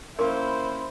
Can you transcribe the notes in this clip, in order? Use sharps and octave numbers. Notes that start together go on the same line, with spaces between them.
A#3 C#4 E4 A#4 C5 C6 C#6